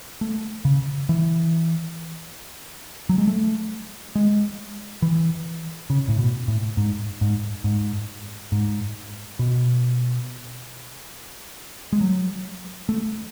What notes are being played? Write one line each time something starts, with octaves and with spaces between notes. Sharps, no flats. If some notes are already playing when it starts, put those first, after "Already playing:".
A3
C#3
E3
F#3
G#3
A3
G#3
E3
C#3
A2
B2
A2
G#2
G#2
G#2
G#2
B2
G#3
F#3
A3